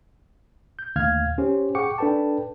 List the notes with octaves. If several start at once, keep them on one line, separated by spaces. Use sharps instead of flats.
G6
D#2 D3 A3 F5 F6 G#6
C#4 G4 C5
G#4 F#5 G5 C#6 D6 C#7
D4 A4 B4 G5 A5